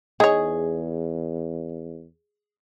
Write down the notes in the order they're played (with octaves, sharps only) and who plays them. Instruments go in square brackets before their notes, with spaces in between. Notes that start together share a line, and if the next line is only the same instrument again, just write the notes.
[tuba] E2 [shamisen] D#4 C#5 [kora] G#4